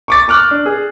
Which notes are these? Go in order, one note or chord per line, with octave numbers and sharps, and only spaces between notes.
C#6 D6 A6
C#6 D6 F6 F#6
D4
G#4